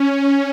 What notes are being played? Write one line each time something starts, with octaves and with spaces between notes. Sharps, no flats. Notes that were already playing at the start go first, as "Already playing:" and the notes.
Already playing: C#4